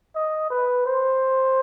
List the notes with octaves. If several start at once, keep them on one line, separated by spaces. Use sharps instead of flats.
D#5
B4
C5